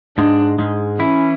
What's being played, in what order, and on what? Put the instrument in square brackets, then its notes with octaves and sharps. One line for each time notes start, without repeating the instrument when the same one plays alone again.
[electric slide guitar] G#2 G#3 [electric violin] D4
[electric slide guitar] G#2 G#3
[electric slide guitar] E3 E4 [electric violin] C#4